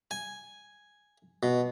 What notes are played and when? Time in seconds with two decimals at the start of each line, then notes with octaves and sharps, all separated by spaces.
0.11 G#5
1.43 B2